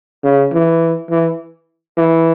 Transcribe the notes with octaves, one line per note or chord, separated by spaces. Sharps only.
C#3
E3
E3
E3